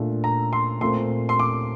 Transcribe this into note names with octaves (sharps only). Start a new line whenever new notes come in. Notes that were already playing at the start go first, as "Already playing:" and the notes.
Already playing: A#2 A3 D4
A#5
C6
A#2 A3 C4 C6
C6
D6